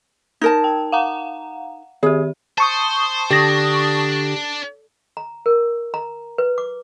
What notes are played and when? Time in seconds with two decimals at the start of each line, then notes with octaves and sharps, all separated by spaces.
0.41 D#4 A#4 A5 G#6
0.64 G5
0.92 F5 F#5 A#5
2.03 D#3 G4 G#4
2.58 C5 A5 C#6 D#6
3.31 D3 D4 G4 A#6
5.17 A#5
5.46 A#4
5.94 A#5
6.38 B4
6.58 D6